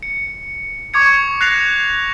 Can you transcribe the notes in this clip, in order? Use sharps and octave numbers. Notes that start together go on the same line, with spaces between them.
C#7
C#6 D6 G#6 C#7
F#6 A6 A#6 C7 F7